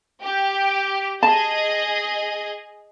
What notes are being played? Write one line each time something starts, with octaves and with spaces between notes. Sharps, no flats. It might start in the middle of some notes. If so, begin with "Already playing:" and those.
G4
G#4 D#5 A5